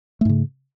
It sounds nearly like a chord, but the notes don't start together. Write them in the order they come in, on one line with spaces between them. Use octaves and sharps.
A3 G#2 C#3